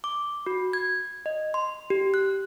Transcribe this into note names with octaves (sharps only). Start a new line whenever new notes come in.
D6
F#4
G#6
D#5
C6
G4
F#6